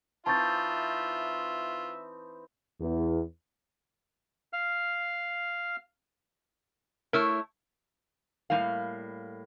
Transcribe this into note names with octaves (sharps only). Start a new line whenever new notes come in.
E3 C4 D#4 F4 E5 A5 C#6 A6
E2
F5 F6
A3 E4 A#4 C#5 E6 F6
A2 G3 A#3 F5